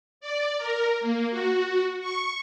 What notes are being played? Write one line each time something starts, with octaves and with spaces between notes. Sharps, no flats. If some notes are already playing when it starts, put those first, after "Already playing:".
D5
A#4
A#3
F#4
C#6